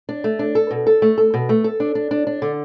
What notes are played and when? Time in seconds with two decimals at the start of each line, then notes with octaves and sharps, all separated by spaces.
0.09 D4
0.24 A3
0.39 D4
0.55 A4
0.71 B2
0.87 A4
1.02 A3
1.18 A4
1.34 B2
1.49 A3
1.64 A4
1.80 D4
1.95 D4
2.11 D4
2.27 D4
2.42 D3